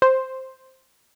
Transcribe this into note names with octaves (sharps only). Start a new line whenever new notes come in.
C5